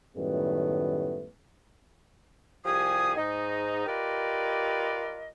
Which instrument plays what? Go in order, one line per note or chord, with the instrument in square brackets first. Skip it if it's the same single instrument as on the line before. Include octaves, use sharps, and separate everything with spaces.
[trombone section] F#2 A2 D#3 G3 A3 B3
[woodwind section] C2 F3 G4 G#4 G#5 D#6
G#2 D#4
F4 G4 A#4 B4 D5 D#5